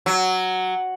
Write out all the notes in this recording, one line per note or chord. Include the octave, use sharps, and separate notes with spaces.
F#3